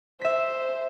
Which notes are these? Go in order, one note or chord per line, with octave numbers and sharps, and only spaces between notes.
C5 E5 B6